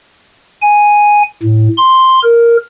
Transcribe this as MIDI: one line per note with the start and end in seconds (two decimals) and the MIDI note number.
0.62 1.23 80
1.43 1.68 45
1.77 2.20 84
2.23 2.57 70